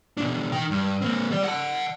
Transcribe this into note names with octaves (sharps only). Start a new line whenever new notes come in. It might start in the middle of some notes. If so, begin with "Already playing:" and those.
B2 D4
D#4 G5
G2
A#3 C4
G3 D5
F#5 A5